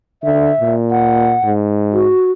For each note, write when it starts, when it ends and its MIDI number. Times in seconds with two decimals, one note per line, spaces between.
0.23 0.51 50
0.23 0.74 76
0.60 1.36 46
0.91 1.53 78
1.44 2.12 44
1.93 2.32 66